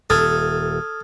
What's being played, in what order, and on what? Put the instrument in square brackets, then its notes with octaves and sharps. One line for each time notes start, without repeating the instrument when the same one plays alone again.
[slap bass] D#1 [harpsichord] A4 [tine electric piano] D#6 F6 G#6